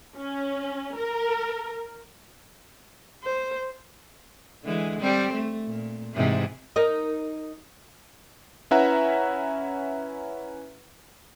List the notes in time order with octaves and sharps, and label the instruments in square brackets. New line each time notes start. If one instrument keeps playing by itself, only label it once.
[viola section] C#4
A#4
[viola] C5
[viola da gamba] D3 E3 G#3
G3 C4
A3
A#2
G#2 C3 E3
[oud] D#4 A#4 D#5
[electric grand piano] C#4 E4 B4 E5 F#5 A#5